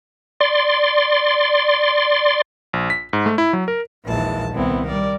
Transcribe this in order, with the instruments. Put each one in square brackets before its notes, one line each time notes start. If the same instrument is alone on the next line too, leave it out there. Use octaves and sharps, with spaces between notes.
[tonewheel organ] D5 C6
[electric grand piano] A#1
B6
G#2
A3
E4
F#3
A#4
[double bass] A#1 D#2 [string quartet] E3 G#3 A5
[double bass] C2 C4 [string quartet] D#3 B3 E4
[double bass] G3 [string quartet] A#4 D5